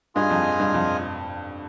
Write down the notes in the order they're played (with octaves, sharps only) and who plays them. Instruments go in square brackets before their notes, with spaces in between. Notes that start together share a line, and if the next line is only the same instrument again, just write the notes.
[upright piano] G2 [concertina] F4 G#4 D#5 G#5
[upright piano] F2
G2
F2